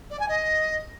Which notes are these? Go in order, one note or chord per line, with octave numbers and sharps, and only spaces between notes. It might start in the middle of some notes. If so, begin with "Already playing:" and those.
D5
G#5
D#5